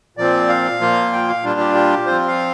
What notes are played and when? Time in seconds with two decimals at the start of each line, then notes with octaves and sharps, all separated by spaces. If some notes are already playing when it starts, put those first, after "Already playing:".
0.17 A#2 F3 C4 D5
0.49 F5
0.80 A#2 F3 A#3 F4
1.13 G5
1.29 F5
1.43 A#2 G3 D4 F4
1.60 G4
1.75 G4
2.06 F3 C4 F4 C5
2.28 F5